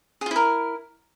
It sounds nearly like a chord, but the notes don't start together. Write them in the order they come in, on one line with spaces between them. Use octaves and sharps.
G#4 F4 E4 A#4